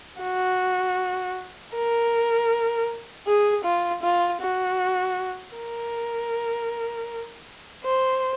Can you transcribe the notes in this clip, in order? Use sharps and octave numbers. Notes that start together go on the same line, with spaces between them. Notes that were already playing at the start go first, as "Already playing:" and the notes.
F#4
A#4
G#4
F4
F4
F#4
A#4
C5